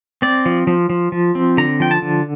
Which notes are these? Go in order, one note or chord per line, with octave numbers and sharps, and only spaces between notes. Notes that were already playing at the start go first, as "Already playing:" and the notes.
C4 D5
F3
F3
F3
F3
C4
D3 A#5
F3 G5
A5
D3